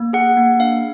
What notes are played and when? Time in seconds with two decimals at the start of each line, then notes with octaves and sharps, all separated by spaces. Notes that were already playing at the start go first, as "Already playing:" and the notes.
Already playing: A#3
0.13 G#4 F#5
0.37 A#3
0.59 D4 F5